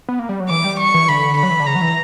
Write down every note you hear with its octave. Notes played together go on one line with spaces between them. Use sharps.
B3
A#3
G3
F#3
E3 D6
G3
C#6
E3
D3 B5
B5
F#3
E3
D3
C#3 A#5
F#3
E3